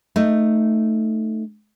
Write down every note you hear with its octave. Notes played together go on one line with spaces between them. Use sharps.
A3 D#4